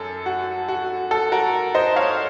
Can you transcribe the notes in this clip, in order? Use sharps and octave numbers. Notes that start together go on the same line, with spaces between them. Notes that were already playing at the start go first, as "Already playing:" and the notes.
Already playing: F#2 A4
F#4
F#4
A4
F#4 A#4
C5 D#5
C#5 F5